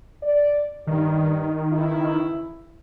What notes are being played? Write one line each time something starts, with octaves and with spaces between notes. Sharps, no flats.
D5
G2 D#3
C#3 E3 E4